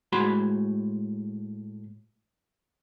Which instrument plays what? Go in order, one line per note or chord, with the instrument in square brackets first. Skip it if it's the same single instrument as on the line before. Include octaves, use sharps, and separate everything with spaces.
[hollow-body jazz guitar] A2 G#3 F#4 B5 C6